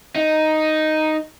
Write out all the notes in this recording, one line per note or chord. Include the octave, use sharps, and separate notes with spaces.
D#4